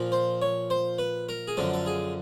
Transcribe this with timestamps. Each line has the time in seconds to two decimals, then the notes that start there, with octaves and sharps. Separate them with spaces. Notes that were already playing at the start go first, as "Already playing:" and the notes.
Already playing: A#2 F3
0.12 C5
0.42 C#5
0.70 C5
0.99 B4
1.29 A#4
1.48 G#4
1.57 F#2 D3 F3 A4
1.74 A4
1.86 G#4